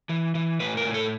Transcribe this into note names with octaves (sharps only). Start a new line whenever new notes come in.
E3
E3
A2 B4
A#4
A2
A4